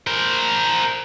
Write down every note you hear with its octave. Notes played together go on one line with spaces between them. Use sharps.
A#4 C5